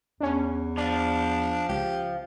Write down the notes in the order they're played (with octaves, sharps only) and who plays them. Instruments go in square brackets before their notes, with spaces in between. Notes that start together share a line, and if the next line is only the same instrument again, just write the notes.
[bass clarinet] E2 [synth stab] C#4 D4
[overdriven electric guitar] F3 [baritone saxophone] D4 [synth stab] D5
[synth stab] C#2 [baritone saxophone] G4